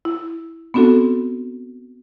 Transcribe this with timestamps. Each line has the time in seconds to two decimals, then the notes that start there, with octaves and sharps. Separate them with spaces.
0.05 E4
0.74 B3 C4 D4 F#4 A4